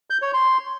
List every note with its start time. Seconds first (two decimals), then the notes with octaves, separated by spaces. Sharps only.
0.10 G6
0.22 C#5
0.34 C6